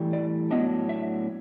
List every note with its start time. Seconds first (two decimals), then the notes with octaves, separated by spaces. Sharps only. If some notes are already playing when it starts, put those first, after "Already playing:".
Already playing: A2 E3 G3
0.13 D5
0.51 A2 F#3 B3 D4 D#5
0.89 E5